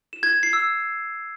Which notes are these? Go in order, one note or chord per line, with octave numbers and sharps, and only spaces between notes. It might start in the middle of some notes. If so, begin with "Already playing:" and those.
E7
G#6
G#6
C7
E6